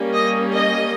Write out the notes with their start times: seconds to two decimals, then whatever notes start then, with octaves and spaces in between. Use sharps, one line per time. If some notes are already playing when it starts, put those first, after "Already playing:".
Already playing: G3 A#3 C#4
0.14 D#5
0.53 D#5